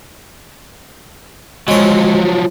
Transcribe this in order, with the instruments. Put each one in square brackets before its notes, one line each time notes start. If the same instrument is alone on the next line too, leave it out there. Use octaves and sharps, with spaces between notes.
[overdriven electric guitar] F3 F#3 [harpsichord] G#3 C#5